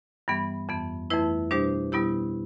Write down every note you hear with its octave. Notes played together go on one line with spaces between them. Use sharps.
G2 E3 G3 B3
F2 E3 B3
F2 E3 A3 E4 B4
B2 G3 D4 G4 C5
B2 G3 B3 E4 G4